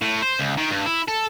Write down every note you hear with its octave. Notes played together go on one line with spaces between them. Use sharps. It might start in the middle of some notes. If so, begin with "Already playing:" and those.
A2
C5
C#2
D#3
G2
E4
A4